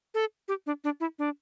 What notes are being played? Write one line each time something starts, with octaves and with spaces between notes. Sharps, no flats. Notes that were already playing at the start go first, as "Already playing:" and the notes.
A4
G4
D4
D4
E4
D4